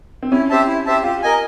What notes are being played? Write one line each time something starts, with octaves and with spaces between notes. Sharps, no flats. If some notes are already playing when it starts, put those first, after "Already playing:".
C4
C#4 E4
G4 C5 E5 A5
E4
G4 C5 E5 A5
F4 G4
A#4 D#5 G#5